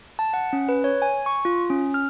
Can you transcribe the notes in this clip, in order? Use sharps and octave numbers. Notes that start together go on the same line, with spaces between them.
A5
F#5
C#4
B4
C#5
G#5
C#6
F4
C#4
F6